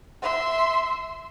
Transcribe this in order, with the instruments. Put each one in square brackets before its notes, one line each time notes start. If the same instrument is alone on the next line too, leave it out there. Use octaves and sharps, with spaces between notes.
[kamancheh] E5 C6